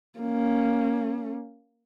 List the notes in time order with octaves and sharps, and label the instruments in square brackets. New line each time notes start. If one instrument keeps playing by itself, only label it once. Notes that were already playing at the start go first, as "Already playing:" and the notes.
[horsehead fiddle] A#3 C#4